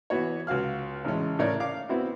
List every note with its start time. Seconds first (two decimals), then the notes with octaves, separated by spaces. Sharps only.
0.10 E3 B3 F#4 C#5
0.47 C#2 F#4 F5 F6
1.04 A1 C#3 G#3 C#4
1.39 A2 C#3 A#4 C#5 D5
1.60 F5 D6
1.89 B3 C4 E4 F#4